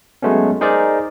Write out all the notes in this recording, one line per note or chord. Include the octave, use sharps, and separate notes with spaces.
F#3 G#3 A3 B3 C#4
D#4 G#4 A#4 C5 D5